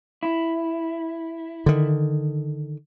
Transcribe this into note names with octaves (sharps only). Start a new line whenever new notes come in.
E4
D3 D#3